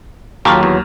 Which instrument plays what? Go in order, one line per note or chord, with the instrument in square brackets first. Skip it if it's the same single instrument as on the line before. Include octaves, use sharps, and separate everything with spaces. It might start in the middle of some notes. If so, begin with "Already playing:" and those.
[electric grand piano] D#2 F6 [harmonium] F#3 [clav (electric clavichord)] F4 G4 A4 [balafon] A#5 C#6
[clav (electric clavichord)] E2